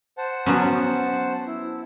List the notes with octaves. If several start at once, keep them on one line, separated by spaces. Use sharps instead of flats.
C5 F#5 A5
F#3 B3 C#4
E4